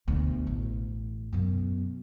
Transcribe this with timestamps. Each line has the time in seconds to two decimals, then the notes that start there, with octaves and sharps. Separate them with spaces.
0.08 D2 B2
0.47 A1
1.33 F#2 B2